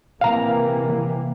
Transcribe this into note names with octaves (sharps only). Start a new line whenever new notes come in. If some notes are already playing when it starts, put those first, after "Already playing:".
C3 E3 A#3 F5 A#5